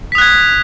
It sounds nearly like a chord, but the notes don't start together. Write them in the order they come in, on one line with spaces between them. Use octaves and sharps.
B6 D#6 F#6 G#6